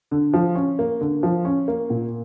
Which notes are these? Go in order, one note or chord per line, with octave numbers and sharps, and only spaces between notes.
D3
F3
C#4
A#3
D3
F3
C#4
A#3
A#2